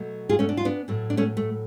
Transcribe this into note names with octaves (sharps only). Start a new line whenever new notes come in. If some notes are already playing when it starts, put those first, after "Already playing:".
Already playing: B2 F#3 A3
F4 G#4
A3 C#4
D4
F4
B3 D4
A2 F#3 A3
D4
A3 C#4
A3